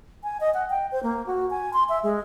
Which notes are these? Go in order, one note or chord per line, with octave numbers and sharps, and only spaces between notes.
G#5
D#5
F#5
G5
C5
A#3
F#4
G#5
C6
E5
G#3